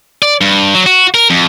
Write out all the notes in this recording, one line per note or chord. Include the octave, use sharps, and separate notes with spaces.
D5
G2
F#3
F#4
A#4
F2